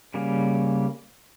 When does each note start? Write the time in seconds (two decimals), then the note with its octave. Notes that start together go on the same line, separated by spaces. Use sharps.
0.14 C#3 G3 A#3